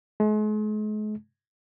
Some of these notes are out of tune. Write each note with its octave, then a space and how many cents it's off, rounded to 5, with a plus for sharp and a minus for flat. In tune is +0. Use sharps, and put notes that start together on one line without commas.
G#3 +40